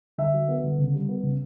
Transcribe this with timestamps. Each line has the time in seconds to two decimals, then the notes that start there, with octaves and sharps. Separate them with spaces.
0.18 D3 E5
0.34 F#3
0.49 B3
0.64 D3
0.78 C#3
0.94 G3
1.09 B3
1.23 C#3